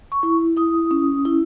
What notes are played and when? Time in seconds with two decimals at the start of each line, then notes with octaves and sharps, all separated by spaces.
0.12 C#6
0.23 E4
0.57 E4 D#6
0.91 C#4
1.25 E4